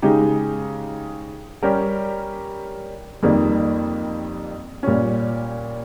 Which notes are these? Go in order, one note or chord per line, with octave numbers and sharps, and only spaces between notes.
C#3 G#3 D#4 G4
G3 C#4 G4 A#4
F2 D#3 G3 A#3
A#2 G3 C#4